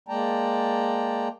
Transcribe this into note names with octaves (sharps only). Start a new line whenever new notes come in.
G#3 A#3 D5 G5 A5 A#5